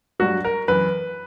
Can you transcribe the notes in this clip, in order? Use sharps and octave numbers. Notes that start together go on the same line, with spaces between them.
G2 F#3 F#4
A#4
F#2 E3 B4